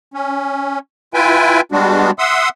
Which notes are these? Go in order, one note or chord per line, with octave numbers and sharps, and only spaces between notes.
C#4
E4 F4 B4 E5 G5 G#5
G3 G#3 B3 D4 F#4
E5 F#5 C6 D#6 E6